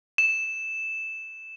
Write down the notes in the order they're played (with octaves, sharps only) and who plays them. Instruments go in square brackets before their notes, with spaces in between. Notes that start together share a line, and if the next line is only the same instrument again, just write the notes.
[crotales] E7